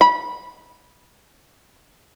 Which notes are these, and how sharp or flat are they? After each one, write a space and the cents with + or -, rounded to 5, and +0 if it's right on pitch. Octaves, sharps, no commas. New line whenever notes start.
B5 -20